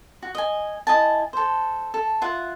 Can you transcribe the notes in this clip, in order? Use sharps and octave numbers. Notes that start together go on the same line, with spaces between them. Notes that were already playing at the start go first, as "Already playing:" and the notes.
F#4
D#5 G#5
E4 D#5 G#5 A5
A4 C5
A4
F4 E5 F#5